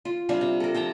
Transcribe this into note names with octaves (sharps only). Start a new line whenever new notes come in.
F4
C3 G3 D4 F5
C3
A4 A#4
F3 G5 A5 A#5